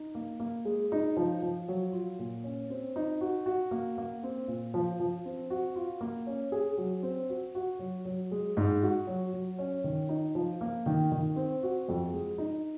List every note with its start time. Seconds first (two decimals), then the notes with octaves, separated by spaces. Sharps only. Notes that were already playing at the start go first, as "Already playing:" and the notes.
Already playing: D#4
0.15 A#3
0.40 A#3
0.65 G#3
0.92 D#4
1.16 F3
1.42 F3
1.68 F#3
1.93 F4
2.19 A#2
2.44 C#4
2.70 C4
2.96 D#4
3.21 F#4
3.46 F#4
3.71 A#3
3.98 A#3
4.23 C4
4.48 A#2
4.74 F3
5.00 F3
5.25 C4
5.50 F#4
5.76 F4
6.01 A#3
6.27 C#4
6.52 G#4
6.78 F#3
7.03 C4
7.29 F#4
7.55 F#4
7.79 F#3
8.05 F#3
8.31 G#3
8.57 G#2
8.82 F#4
9.07 F#3
9.33 F#3
9.58 C#4
9.84 D#3
10.09 D#4
10.35 F3
10.61 A#3
10.86 D#3
11.12 D#3
11.36 C4
11.63 F#4
11.88 F2
12.13 G#3
12.38 D#4